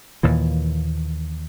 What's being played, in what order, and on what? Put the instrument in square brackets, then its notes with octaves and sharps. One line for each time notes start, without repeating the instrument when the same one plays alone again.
[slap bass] D#2 A#2 E3